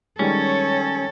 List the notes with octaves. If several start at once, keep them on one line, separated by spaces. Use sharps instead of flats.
D#3 G3 G#3 C#4 A4 C#5